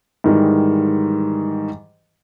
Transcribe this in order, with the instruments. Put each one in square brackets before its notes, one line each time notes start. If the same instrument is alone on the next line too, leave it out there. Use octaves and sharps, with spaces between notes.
[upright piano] G#2 D#3 E3 G3